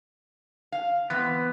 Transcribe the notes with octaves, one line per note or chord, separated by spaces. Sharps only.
F5
E3 B3 C4